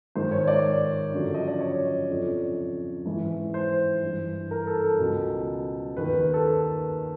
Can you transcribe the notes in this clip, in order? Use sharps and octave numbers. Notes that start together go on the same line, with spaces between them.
G#2 D#3 C5
C#5
D5
F#2 D3 F3
D#5
D5
C#5
F2 C#3 F3
G#2 E3
C5
G2 E3
A#4
A4
A4
C#2 B2
D#2 D#3 B4
B4
A4